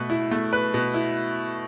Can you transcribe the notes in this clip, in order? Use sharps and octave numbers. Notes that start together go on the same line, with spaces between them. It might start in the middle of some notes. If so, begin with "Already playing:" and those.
Already playing: B2 A3 B4
E4
A3
B4
B2
E4